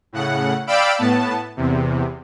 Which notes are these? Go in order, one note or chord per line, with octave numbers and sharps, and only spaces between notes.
A2 C#3 F#5
D5 F5 G5 B5 E6 D7
A2 B3 A5
E2 C3